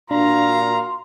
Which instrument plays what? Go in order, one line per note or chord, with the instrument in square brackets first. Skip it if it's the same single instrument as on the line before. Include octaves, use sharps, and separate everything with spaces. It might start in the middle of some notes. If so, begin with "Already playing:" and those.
[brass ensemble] A#2 A#5 [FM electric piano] D4 [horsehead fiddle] F#4 F5 [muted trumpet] C6